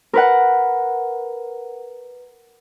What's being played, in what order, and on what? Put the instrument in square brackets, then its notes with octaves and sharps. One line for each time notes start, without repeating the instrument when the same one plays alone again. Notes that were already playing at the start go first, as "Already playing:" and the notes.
[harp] A#4 B4 F#5